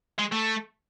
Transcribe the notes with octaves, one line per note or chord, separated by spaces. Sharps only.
G#3
A3